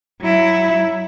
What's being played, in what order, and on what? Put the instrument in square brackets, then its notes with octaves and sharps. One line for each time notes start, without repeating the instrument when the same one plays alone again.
[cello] F#3 E4